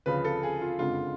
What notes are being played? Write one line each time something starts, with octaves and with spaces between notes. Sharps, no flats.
D2 C#3 F3 B4
A4
G#4
F4
F#1 F2 D3 G#3 F4